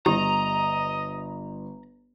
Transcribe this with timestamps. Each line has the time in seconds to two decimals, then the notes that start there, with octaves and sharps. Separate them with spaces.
0.06 G1 G4 D#5 A#5